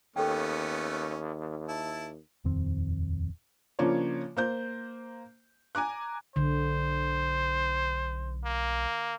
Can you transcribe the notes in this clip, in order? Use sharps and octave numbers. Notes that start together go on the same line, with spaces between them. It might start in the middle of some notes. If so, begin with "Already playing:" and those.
D#2 A3 B3 C#4 A4 G5
E4 A5
D#1 F2 D#3 C4
C#3 F3 A#3 D4 F4 C#5
A#3 C5 G6
G#5 A#5 D6 F#6
B1 D3 C5
A#3